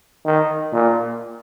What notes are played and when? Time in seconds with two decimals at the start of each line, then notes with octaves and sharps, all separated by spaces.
0.25 D#3
0.72 A#2